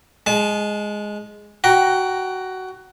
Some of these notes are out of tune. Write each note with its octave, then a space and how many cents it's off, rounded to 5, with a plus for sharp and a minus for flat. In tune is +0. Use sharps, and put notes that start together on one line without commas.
G#3 +0 A5 -35
F#4 +15 G5 +0 A#5 +0